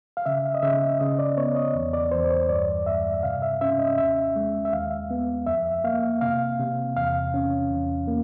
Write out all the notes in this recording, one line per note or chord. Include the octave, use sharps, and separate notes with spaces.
F5
C#3 E5
D#5
C#3 E5
C#3 D#5
D5
B3 C#5
D#5
E2
D5
E2 C5
C#5
G2 D5
G2 E5
C3 F5
E5
C#4 E5
D#5
D#2 E5
G#3
E5
D#2 F5
B3
F2 E5
A#3 F5
C3 F5
C3
E2 F5
C#4
E2
A#3